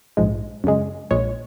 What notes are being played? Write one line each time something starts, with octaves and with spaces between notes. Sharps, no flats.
A#1 G#2 F3 G#3
F#2 C#3 G#3
A#1 A#2 G#3 C#5